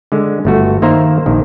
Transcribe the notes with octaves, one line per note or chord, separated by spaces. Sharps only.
D3 G#3
G1 A3 F#4
D#3 A#3 C5 E5 A#5
A#1 D#3